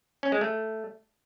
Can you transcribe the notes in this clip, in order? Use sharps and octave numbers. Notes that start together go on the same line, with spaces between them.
C#4
G#3
A3